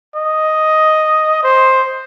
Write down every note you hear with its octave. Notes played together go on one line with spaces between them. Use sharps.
D#5
C5